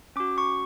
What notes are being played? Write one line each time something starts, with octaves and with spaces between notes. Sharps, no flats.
C#4 F#4 D6
C#6